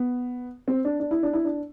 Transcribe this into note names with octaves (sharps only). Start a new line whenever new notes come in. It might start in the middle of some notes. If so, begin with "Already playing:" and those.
Already playing: B3
C4
D4
D4
E4
D4
E4
D4